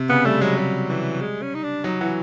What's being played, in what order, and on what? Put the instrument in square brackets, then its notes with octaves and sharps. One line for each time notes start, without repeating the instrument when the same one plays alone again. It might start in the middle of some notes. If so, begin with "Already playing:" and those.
Already playing: [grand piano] C3
[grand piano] C#3 [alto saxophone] B3
[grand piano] G3 [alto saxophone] A3
[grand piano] F#3 [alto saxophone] G#3
[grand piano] G3
[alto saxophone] E3
G#3
C#4
D#4
D4
[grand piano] F#3 [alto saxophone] D#4
[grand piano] E3 [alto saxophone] F#4